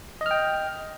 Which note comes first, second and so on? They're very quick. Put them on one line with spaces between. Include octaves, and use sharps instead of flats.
D#5 F6 G5